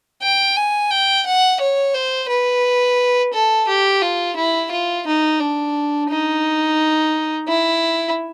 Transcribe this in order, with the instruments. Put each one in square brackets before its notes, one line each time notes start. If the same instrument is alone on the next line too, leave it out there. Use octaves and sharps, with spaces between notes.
[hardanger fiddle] G5
G#5
G5
F#5
C#5
C5
B4
A4
G4
F4
E4
F4
D#4
D4
D#4
E4